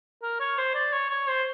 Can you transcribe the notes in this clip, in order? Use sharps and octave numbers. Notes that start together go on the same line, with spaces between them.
A#4
C#5
C5
D5
C#5
C#5
C5